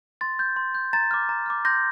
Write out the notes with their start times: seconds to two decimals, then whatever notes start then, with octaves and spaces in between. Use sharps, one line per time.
0.21 C6 A6
0.39 G6
0.56 C6
0.75 G6
0.93 A#5 A6
1.11 D6 F6
1.29 A#5
1.46 D6 F6
1.65 C6 G6 A#6